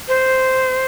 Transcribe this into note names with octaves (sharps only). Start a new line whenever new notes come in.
C5